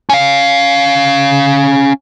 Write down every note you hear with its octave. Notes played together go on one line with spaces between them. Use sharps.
C#4 F5